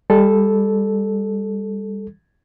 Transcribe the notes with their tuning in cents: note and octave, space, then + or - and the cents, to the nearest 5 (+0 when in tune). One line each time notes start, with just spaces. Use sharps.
G3 +25 A4 -5